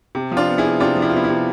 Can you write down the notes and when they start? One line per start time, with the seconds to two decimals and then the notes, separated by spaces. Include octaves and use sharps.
0.15 C3
0.32 F3
0.37 D4 F4
0.48 B3
0.58 E4 G#4
0.64 C3
0.80 C3 D4 F4
0.96 F3
1.02 E4
1.10 F4
1.13 B3 E4
1.24 E4
1.29 C3